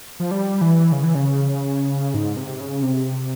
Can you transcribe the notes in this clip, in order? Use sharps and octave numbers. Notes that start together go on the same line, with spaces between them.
F3
G3
E3
C#3
E3
C#3
G#2
C3
C#3
C3